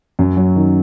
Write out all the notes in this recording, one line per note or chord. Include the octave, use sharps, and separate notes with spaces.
F#2
F#3
D#3